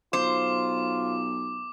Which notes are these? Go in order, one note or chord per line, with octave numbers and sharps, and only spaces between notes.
B1 F4 C5 D6